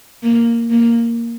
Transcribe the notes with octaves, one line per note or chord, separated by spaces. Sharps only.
A#3
A#3